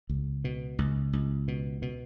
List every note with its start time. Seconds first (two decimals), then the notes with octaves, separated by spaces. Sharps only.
0.09 C#2
0.44 B2
0.79 C#2
1.13 C#2
1.48 B2
1.82 B2